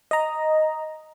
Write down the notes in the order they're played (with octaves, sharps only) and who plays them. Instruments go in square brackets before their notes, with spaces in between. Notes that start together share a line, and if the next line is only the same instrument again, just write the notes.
[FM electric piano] D#5 A#5